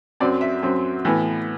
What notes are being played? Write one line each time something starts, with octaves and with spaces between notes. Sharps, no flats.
F#2 F#3 C4 D5
E5
F#2 F#3 C4
A2 E3 B3